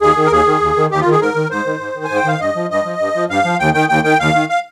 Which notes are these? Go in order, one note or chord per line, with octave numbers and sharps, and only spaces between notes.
D#2 G#4
D#3
A#4
D#2 G#4
D#3
D#2
D#3
D#2 G4
F4
D#3
G#4
G#2 A#4
D#3
G#2 C5
D#3
G#2
D#3
G#5
G#2
G5
D#3 F5
G2 D#5
F3
G2 D#5
F3
G2
F3
G2 F5
F3
D#2 G5
D#3 G5
D#2 G5
D#3 G5
D#2 F5
D#3
F5